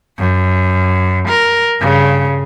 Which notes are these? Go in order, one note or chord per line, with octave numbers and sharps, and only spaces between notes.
F#2
A#4
G2 C#3